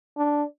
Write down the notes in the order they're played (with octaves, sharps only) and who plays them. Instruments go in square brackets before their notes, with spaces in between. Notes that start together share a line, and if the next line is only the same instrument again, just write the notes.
[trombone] D4